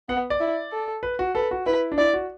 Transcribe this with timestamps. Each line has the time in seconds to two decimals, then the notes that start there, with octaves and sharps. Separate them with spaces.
0.09 B3 F#5
0.30 D5
0.40 E4
0.71 A4
1.03 B4
1.19 F#4
1.35 A4 B4
1.51 F#4
1.66 E4 B4
1.92 D4
1.98 E4 D5
2.14 F#4